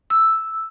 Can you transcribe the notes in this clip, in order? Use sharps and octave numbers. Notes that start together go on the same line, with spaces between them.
E6